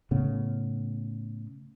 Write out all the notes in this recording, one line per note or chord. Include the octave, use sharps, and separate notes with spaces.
A2 C#3 B3